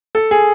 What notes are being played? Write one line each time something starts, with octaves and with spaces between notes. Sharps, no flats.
A4
G#4